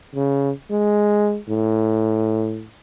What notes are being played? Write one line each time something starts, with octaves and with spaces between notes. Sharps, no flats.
C#3
G#3
A2